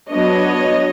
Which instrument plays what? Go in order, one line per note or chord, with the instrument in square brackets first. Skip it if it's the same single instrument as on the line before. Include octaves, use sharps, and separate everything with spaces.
[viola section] F#3 B3 D4 C#5 D#5